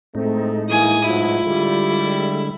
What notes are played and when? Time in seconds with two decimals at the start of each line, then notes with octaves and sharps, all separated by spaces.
0.15 A2 G#3 A3 C4 D#4
0.69 E3 A#3 E4 G#5 D#6
1.05 G#2 B2 F#3 E4 F4
1.47 D3 G3 G#3